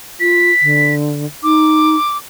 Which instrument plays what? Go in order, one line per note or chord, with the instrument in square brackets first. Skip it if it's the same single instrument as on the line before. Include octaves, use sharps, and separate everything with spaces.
[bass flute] F4 [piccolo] B6
[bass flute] D3
[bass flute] D#4 [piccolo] D6